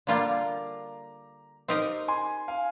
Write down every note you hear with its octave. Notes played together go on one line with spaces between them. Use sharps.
D3 G3 A#3 F4 A#5 D6
C4 D#4 G4 A#4 D#5
G#5 C6
F5 G#5